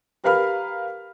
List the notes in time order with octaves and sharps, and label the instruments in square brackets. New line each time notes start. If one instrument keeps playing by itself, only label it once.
[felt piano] G4 A#4 B4 F5 B5 F6